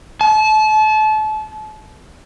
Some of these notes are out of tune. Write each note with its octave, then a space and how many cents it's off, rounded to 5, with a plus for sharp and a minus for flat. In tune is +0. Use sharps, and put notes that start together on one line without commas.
A5 -30